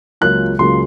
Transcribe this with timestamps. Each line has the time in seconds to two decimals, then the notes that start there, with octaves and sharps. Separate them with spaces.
0.21 C#2 C#3 F#3 A#3 F4 F#6
0.59 C#2 C#3 F#3 A#3 F4 C6